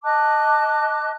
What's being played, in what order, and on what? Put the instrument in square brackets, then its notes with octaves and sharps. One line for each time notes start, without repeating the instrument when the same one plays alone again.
[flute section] D#5 A5 D6 F#6